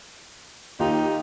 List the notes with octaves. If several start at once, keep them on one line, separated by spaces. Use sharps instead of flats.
D#2 D#4 F4 G4